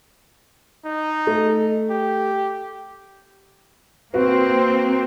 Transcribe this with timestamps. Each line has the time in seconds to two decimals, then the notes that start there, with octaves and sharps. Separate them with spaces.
0.85 D#4
1.27 A3
1.90 G4
4.14 A#3 C4 F#4 B4